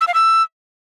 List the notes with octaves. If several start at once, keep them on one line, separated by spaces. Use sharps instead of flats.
E6
F5
E6